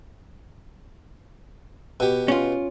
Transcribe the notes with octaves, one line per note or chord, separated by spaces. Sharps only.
B2 G4
C#4 F4